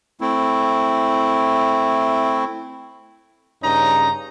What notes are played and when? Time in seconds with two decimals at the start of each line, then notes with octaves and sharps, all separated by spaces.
0.21 A3 C4 E4
3.64 G2 C#3 C#4 D#4 A#5